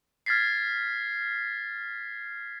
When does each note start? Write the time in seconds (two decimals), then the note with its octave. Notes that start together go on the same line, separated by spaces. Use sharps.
0.26 F6 G#6 A6 B6 C7